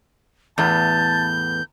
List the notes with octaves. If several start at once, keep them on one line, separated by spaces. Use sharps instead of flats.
E2 A2 B3 A5 G6